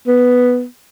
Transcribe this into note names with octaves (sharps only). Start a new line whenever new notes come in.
B3